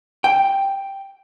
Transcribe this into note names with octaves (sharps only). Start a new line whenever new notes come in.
G5